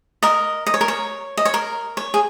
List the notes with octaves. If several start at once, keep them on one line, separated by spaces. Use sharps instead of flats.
A#4 D#5
D#5
C#5
A#4
C#5
D#5
C#5
A#4
C#5
G#4